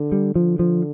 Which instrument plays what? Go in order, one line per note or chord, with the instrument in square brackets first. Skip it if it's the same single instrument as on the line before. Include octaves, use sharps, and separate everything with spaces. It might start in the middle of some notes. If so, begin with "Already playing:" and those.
Already playing: [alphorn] D3
[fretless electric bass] G3
[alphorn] D3 [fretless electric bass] F3
[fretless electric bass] F3